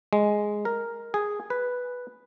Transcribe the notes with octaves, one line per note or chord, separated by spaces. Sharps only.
G#3
A#4
G#4
B4